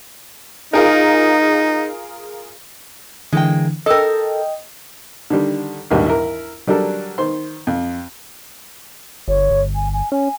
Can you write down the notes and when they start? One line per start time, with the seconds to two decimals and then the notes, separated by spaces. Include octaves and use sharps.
0.73 D#4 F4 G#4 A#4
3.33 D3 E3 G#3 A#3 G5
3.86 A4 A#4 D#5 G5
5.30 D3 D#3 G3
5.91 A#1 D#2 G#2 G3
6.05 E4 A#4
6.67 F#3 G3 D4 A4 A#4
7.18 D#3 C5 C6
7.67 F2
9.28 G1 C#5
9.51 G1
9.75 G#5
9.93 G#5
10.12 C#4 G#5